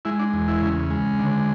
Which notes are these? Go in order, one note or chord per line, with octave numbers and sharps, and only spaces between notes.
G#3 E4
D4
E2
E4
C#3
G#3
D3